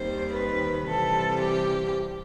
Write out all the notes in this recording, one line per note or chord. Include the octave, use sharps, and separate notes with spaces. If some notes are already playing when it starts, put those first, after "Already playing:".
Already playing: D#2 D#3 G3 C4 C5
B4
C3 E3 G3 C4 A4
G4